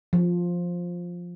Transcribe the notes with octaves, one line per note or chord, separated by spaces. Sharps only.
F3